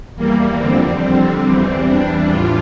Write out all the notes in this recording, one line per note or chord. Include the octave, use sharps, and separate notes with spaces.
E2 E3 G3 A#3
F2 D3 G3 C4
F2 D3 G3
E2 E3 G3
E2 E3 G3 D4
A2 E3 G3 F4